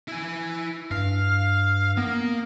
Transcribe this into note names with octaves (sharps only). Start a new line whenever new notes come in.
E4 G#5
G2 F5
A#3 B3